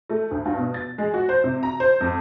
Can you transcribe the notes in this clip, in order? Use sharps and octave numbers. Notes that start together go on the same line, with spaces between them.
A3
D2
G2
B2
A6
G#3
F#4
C5
C3
A#5
C5
F2